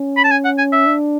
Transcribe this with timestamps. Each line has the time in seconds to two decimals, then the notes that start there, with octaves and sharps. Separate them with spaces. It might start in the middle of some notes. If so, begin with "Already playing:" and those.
Already playing: C#4
0.17 B5
0.24 A5
0.31 G#5
0.45 F#5
0.58 G#5
0.72 E5
0.86 D4